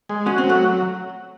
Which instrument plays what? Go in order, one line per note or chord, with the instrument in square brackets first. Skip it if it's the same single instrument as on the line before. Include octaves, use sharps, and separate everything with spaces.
[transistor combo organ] G#3
[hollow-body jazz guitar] C#4 [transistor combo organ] F#4
[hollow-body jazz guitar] C4
[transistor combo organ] F#3
[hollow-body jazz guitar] A3